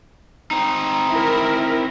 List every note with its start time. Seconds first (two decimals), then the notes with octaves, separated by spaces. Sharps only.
0.51 C4 D#4
1.09 E4 A#4